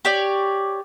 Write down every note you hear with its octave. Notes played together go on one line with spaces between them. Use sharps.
G4 C#5 D5